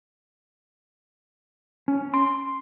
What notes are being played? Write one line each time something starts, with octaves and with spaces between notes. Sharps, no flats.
C#4
C6